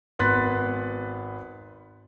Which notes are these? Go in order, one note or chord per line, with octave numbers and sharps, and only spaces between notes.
G#1 B3 C6 F#6 A6 B6